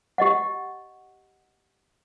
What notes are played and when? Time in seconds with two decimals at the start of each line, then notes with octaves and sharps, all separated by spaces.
0.18 G4 D#5 F#5